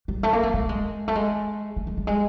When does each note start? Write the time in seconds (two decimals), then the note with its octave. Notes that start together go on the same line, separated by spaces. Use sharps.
0.08 G3
0.23 A3
0.33 A#3
0.43 A3
0.54 A3
0.69 G#3
1.08 A3
1.15 G#3
1.76 A3
1.87 A3
1.97 G3
2.07 G#3